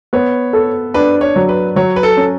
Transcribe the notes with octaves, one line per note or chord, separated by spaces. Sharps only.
B3 C#5
A4
D4 B4
C#5
F#3
B4
F#3 C#5
B4
A4
C#4